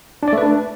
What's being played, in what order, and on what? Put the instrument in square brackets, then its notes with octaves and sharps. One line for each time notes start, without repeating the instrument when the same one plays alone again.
[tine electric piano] D4
D5
A3
B4
D4